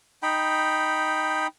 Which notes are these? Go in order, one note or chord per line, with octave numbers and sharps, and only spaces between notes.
D#4 G5 B5